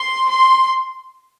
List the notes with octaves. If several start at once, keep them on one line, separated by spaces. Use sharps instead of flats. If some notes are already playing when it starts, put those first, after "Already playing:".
Already playing: C6
C6